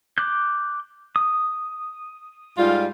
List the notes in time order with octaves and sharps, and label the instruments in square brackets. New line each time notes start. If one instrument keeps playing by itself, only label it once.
[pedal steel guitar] D6 F#6 G6
D#6
[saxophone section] G#2 G3 F4